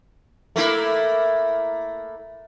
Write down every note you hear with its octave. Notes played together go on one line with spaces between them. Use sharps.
A3 A#3 E4